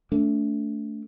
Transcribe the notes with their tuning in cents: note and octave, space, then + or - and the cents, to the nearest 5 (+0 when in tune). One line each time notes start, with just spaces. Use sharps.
A3 +0 D4 -35